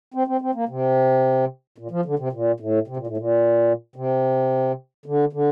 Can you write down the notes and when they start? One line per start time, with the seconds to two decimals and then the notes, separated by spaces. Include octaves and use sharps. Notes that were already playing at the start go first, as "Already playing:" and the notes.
0.14 C4
0.27 C4
0.42 C4
0.55 A#3
0.69 C3
1.78 A#2
1.91 F3
2.05 D3
2.19 C3
2.33 A#2
2.60 A2
2.88 C3
2.97 A#2
3.07 A2
3.18 A#2
3.96 C3
5.06 D3
5.33 D3